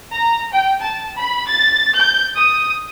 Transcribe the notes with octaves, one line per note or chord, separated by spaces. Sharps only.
A#5
G5
A5
B5
A6
G6
D#6